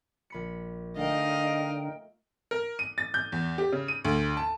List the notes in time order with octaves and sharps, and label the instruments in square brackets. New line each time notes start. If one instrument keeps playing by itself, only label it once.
[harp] A#1 B5 C#7
[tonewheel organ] D3 D4 [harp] A3 [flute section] D#4 A#4 G5 [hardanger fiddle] D#5 F5
[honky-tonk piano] A#4
D#7
A6
G6
E2
G4
C#3
D#7
D2
A5